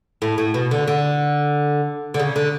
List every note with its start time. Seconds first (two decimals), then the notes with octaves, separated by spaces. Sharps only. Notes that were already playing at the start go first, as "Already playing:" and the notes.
0.22 A2
0.38 A2
0.54 B2
0.71 D3
0.88 D3
2.14 D3
2.20 C#3
2.36 D3